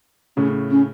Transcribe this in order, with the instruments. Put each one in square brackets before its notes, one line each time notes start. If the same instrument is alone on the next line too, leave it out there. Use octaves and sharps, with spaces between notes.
[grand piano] A2 C#3 [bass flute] C#4
[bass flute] C#4